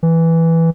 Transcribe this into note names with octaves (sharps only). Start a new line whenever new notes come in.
E3